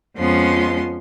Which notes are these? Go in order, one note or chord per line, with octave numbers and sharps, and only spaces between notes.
F2 F3 G#3 B3 C#4 C6